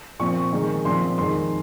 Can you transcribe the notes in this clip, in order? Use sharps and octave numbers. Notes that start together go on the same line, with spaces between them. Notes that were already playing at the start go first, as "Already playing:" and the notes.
A#2 F3 C4 C#6
D#3 G#3 D#4
A#2 F3 C4 C6
F2 D#3 G#3 D#4 C6